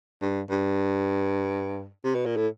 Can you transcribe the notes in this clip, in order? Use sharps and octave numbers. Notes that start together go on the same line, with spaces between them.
G2
G2
C3
B2
A#2
A2